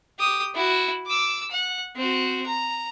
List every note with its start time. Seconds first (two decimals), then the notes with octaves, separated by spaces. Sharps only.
0.19 G4 D#6
0.55 E4 F#4
1.07 D6 E6
1.51 F#5
1.96 C4 F#4
2.46 A#5